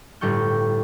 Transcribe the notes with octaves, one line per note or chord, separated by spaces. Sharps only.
G1 A2 G3 C#6 G6